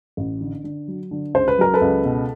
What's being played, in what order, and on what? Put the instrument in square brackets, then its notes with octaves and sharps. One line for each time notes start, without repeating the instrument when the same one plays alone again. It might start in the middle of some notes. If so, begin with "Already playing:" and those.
[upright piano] A1
D3
D3
F#3
D3
C#2 C5
B4
F#3 A#4
A4 B4
C#2
B2